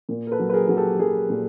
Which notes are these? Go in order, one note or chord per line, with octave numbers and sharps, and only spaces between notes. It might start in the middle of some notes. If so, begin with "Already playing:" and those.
A#2
A#4
A4 B4
F#3
B4
G#4 A#4
F#3 G#4
G4 A4
F#3 G#4 A#4
A#2